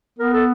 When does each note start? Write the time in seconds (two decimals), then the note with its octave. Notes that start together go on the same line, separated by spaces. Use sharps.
0.18 B3 A#4
0.33 A4